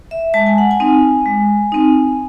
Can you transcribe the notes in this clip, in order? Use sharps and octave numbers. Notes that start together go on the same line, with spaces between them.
E5
G#3 A5
G#5
F#5
G#5
C4 D#4
G#3
C4 D#4